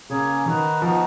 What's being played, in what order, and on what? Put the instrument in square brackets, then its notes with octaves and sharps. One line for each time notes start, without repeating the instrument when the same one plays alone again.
[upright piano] C#3 [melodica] A#3 C#4 G#4 C#5
[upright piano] D#3 [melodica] D#4 F#4 B4
[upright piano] F3 [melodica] B3 D#4 F#4